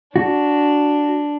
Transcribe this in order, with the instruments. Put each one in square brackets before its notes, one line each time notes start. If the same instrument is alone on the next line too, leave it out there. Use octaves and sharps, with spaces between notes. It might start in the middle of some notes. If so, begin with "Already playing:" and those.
[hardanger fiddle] D4 [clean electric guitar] F#4